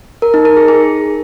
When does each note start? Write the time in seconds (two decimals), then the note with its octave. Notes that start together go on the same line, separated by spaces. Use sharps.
0.22 A#4
0.34 D#4
0.45 A#4
0.57 G#4
0.68 G#4